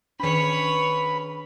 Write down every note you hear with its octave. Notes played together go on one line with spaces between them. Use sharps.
D#3 D4 B4 C#5 B5